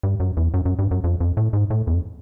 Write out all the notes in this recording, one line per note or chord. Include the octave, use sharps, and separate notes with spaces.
G2
F#2
E2
F#2
F#2
G2
F#2
F2
F2
A2
G#2
A2
E2
F2